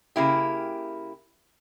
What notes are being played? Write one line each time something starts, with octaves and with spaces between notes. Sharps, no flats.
C#3 A#3 E4 G4